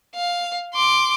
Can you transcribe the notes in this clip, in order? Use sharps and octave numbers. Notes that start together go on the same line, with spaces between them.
F5
C6 D6